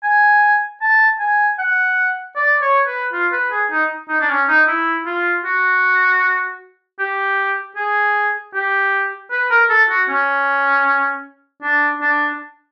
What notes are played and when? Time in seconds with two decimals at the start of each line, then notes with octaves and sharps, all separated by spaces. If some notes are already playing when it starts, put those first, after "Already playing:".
0.04 G#5
0.81 A5
1.19 G#5
1.59 F#5
2.36 D5
2.61 C#5
2.87 B4
3.13 F4
3.32 B4
3.52 G#4
3.71 D#4
4.09 D#4
4.21 D4
4.29 C#4
4.48 D#4
4.67 E4
5.06 F4
5.45 F#4
6.99 G4
7.76 G#4
8.54 G4
9.31 B4
9.50 A#4
9.69 A4
9.89 F#4
10.09 C#4
11.63 D4
12.01 D4